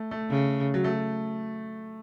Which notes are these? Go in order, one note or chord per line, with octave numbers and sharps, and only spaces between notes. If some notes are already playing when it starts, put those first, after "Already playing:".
Already playing: A3
A3
C#3
F#3
A3